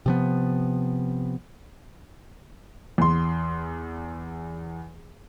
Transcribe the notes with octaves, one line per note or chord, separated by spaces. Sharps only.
C3 F3 B3
E2 C6